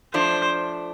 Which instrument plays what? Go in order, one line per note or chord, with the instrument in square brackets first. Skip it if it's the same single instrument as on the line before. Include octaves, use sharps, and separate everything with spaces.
[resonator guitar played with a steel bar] F3 A3 D4 [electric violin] C5